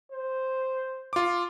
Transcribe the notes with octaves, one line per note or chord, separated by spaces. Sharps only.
C5
F4 D6